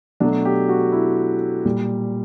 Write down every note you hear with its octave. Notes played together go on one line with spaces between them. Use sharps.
B2 F#3 A3 D4
G4
F#4
E4
A#2 G3